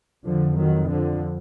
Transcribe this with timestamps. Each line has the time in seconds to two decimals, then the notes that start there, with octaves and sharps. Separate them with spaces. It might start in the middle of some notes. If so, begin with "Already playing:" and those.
0.24 F2 D3 F3
0.55 D#3 F#3
0.87 D3 F3